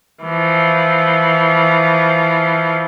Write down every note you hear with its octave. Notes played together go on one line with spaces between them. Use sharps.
E3 F3